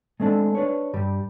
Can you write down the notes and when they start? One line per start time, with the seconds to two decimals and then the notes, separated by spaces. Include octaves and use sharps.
0.20 G#3 A3 C4 D4
0.55 D4 B4 C#5
0.93 G2 G3